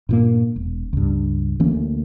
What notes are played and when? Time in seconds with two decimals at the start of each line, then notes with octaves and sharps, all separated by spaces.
0.09 G2 A#2 A#3
0.56 E1
0.93 C#2 G2
1.60 D2 E3 A#3 C#4